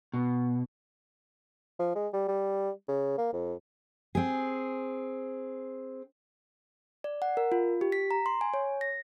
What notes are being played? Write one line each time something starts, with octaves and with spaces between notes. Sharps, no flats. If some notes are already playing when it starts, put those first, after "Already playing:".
B2
F3
G#3
G3
G3
C#3
A#3
F2
C4 G#4
D5
F#5
A#4
F4
G4
B6
A#5
C6
G#5
C#5
A#6